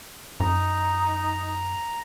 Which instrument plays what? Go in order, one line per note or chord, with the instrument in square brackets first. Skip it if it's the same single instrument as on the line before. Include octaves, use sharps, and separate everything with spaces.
[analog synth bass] F#2 [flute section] D#4 [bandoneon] A#5